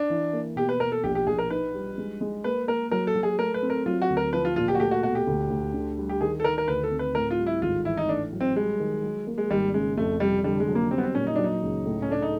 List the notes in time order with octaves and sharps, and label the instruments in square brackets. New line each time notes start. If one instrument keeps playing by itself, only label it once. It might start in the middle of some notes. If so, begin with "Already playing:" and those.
Already playing: [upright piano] D4
[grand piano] E3
A#3
[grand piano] B2 [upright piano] G4
[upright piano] B4
[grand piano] B2 [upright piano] A#4
[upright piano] A4
[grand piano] A#1 [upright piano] G4
[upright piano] G4
[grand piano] A#1 [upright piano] G#4
[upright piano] A#4
[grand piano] D#4 [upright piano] B4
[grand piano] G3
G#3
G#3
[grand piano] A#3 [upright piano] B4
[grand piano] A#3 [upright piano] A#4
[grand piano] F#3 [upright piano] A#4
[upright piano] A4
[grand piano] F#3
[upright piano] G#4
[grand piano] A3 [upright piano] A#4
[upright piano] B4
[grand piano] C4
[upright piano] A#4
[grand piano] F#3 [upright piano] F4
[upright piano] F#4
[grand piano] D2
[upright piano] A#4
[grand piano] F3 [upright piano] B4
[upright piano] F4
[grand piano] A#2 [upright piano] F4
[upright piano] G4
F#4
[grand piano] A3 [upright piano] G4
[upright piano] F#4
[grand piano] B2 [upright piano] F#4
[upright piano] G4
[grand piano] D2
D2
D3
G3
[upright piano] G4
[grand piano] D#3 [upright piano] G#4
[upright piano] A4
[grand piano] D#3 [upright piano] A#4
[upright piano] A#4
[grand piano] D2 [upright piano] B4
[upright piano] A4
[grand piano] C4
[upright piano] B4
[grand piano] A2 [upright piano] A#4
[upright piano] F4
[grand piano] G3
[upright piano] E4
[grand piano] G#1 [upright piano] F4
[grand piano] E3 [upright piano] E4
[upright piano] D#4
[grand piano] A2 [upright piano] D4
[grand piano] F#3
[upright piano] C4
[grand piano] G3 [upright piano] G#3
[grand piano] D#3
F#3
A#3
[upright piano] G#3
[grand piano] G#1 [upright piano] G3
[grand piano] C#3 [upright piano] G#3
[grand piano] F2 [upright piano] A3
[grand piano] C3 [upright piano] G3
[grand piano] D3 [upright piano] G3
[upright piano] G#3
[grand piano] F#3
[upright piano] A#3
[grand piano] G3 [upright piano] C4
[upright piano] B3
C4
[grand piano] A#2 [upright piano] C#4
[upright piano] D#4
[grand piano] F#3 [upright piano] D4
[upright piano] D#4
[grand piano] C#2
A2
[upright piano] C#4
[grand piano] A3 [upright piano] D4
[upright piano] D#4